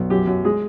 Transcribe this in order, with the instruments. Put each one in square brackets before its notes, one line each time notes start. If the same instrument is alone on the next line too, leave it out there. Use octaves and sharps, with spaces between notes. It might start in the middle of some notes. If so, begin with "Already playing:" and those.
Already playing: [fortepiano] B1
F#2 G4
F#2
G#3 G#4